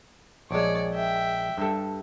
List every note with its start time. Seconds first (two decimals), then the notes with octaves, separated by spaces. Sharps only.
0.51 A#1 G#3 C#5 D5
0.93 E5 G5
1.58 G2 A4